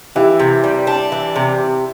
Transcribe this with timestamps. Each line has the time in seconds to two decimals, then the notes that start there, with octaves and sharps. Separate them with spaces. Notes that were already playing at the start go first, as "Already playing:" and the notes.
0.15 E3 E4 G4
0.39 C3
0.64 G3
0.87 D4
1.12 E3
1.36 C3